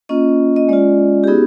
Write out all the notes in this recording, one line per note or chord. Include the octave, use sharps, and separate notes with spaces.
A#3 C#4 F4 D#5
D#5
G#3 C#4 F4 D5
G4
B3 D#4 F#4 G#4